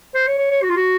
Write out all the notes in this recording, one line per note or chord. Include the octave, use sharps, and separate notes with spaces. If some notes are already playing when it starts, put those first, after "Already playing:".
C5
C#5
C#5
C#5
F#4
F4
F#4